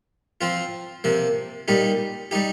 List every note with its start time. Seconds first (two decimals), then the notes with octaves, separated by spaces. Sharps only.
0.41 F3 C4 F4
1.04 C3 F3 A#3
1.68 A#2 G3 D#4 G4
2.31 G3 D#4 G4